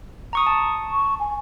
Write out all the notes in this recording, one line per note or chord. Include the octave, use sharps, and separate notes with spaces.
A#5 C#6 D#6
A5
C#6
G#5